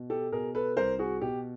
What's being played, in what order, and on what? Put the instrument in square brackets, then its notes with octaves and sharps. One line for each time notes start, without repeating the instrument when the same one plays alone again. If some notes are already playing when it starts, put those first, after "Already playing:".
Already playing: [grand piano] B2
G4 A4
B2 G#4 A#4
A4 B4
C2 A#4 C5
F#4 G#4
B2 G4